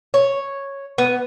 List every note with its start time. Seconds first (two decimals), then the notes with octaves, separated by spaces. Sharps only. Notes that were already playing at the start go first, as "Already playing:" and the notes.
0.14 C#5
0.98 B3